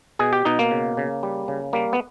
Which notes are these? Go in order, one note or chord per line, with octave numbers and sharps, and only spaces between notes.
B2 G#4
G4
B2 D#4
A#3
C#3
C#3
G3
C#3
G3 A#3
B3